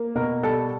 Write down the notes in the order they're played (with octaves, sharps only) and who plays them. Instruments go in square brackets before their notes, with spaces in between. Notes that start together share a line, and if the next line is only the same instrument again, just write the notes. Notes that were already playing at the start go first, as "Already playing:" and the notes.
Already playing: [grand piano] A#3
[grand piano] B2 [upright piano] A#4
[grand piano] G3 [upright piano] A4